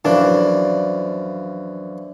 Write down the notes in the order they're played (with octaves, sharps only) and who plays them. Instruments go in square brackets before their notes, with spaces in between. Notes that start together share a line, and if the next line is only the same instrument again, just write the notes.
[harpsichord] F#2 E3 F3 [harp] D4